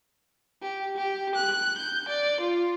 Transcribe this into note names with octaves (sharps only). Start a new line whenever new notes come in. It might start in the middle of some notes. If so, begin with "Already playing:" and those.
G4
G4
F#6
G6
D5
F4